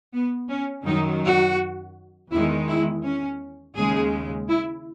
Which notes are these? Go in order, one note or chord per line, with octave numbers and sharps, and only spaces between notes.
B3
C#4
F#2 D#3 F#3 D#4
F#4
E2 D#3 G#3 E4
E4
C#4
D#2 C#3 G#3 G#4
E4